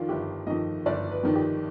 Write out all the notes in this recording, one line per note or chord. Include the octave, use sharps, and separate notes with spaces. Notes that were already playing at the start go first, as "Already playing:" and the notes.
Already playing: F2 D#3 D4 F4
G1 G4
F2 D#3 D#5
G1 D5
B4
F2 D#3
G4